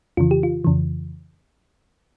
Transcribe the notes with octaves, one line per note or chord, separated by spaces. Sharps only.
F2 C#3 E3 F4
G4
F4
F2 C#3 E3